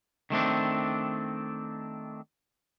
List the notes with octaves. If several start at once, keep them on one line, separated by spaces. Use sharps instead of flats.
D#3 A3 C4 D4